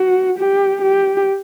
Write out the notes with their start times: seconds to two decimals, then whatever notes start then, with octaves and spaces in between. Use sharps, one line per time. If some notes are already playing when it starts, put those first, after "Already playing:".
Already playing: F#4
0.38 G4
0.82 G4